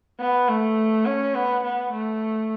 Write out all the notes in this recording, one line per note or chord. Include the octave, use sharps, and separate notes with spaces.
B3
A3
C#4
B3
B3
A3